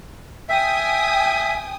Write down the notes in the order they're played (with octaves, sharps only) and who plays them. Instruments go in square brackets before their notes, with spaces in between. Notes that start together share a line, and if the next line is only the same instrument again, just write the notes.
[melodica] E5 [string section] G5 G#5 D#6